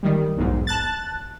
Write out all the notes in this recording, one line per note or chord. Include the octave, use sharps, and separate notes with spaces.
D#3 G3
B1 E2 G#2
A5 F#6 A6